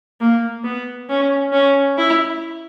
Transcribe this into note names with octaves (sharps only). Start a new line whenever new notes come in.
A#3
B3
C#4
C#4
E4